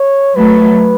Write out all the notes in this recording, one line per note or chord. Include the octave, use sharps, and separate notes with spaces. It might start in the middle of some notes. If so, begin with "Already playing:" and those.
Already playing: C#5
F#3 A3 B4